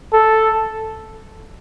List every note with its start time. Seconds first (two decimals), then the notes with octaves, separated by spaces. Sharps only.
0.13 A4